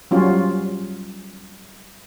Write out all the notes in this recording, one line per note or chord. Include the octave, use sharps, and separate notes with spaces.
F#3 G3 C#4 F4